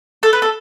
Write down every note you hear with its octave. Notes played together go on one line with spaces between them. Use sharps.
A4
B4
A4